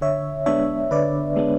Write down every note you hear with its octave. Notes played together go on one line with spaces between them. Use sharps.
D3 C#5 E5
G#3 B3 D4 C#5 E5
D3 B4 D5
G#3 B3 D4